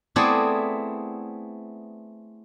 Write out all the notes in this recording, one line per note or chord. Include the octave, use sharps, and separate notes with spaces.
A3 B3 C4 E4 G#4 D5